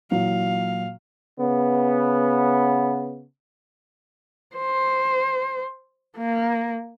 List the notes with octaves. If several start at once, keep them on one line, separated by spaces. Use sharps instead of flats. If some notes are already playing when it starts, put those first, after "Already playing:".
A#2 E3 F#3 F5
C#3 B3
C5
A#3